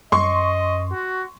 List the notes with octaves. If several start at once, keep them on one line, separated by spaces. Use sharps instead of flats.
F#2 D#5 C6 C#6
F#4